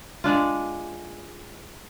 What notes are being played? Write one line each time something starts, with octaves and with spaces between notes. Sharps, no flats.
G#3 D4 F4